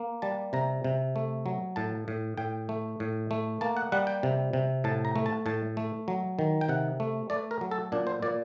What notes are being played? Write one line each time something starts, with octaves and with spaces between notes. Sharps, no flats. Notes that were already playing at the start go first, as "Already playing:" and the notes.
Already playing: A#3
G3 A5
C3 A#5
C3
A3
F#3
A2 A5
A2
A2 G5
A3
A2
A3
A#3 A5
F#5
G3 F#5
G5
C3
C3
A2 A5
A#5
A3
A5
A2 A5
A3
F#3
D#3
G5
C3 F#5
A3
A3 D5
A#4
F#3
A4
A#2 D4
C5
A#2 D5